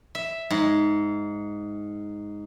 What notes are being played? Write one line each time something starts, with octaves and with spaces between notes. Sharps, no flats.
E5
G#2